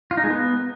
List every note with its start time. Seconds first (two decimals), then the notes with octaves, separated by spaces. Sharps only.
0.11 F4
0.17 D#4
0.24 G#3
0.30 B3